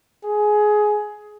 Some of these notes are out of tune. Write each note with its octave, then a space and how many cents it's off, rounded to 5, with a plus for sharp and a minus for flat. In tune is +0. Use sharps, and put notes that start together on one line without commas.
G#4 +15